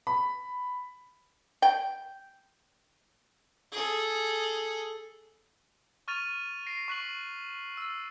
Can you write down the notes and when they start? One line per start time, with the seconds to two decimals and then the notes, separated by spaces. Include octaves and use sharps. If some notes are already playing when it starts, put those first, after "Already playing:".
0.07 B5
1.62 G5
3.72 G#4 A4
6.08 C#6 F6 A6 D#7 F7
6.66 A#6 C7 D7
6.88 C#6 F#6 B6 F#7
7.77 E6 A6